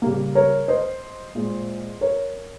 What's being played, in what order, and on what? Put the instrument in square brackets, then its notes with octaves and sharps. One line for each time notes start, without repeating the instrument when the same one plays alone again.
[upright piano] C#3 G3 A#3
A#4 C#5
C5 D#5
A#2 G#3
A#4 C#5